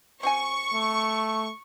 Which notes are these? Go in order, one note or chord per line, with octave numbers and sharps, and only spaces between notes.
C4 F#4 G#5 C#6
A3